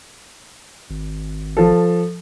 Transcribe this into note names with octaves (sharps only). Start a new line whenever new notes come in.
G#1
F3 A4